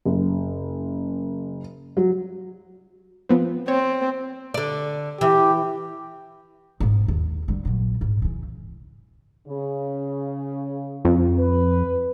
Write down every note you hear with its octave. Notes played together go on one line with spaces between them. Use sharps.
F#1
F#3
F3 B3 C4
C4 C#5
D3 D5
E3 G4
G#2 B3
D#2
D3 G3
A#1 F#3
G#2
C#3 E3
C#3
F2
B4